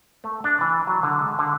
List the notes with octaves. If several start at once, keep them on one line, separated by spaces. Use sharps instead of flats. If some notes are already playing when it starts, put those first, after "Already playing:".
A3
D4
E3
F#3
D3
G#3
D3